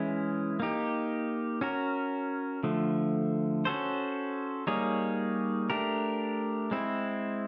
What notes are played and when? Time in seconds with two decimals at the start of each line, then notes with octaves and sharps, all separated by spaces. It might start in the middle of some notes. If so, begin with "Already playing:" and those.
Already playing: E3 G#3 C#4 E4
0.60 A#3 D#4 G4
1.61 C#4 F#4 A#4
2.63 D3 F3 A3
3.65 C#4 F#4 A4 C5
4.67 G3 A#3 D#4 G#4 C#5
5.70 A3 D4 G4 A#4
6.71 G#3 C4 E4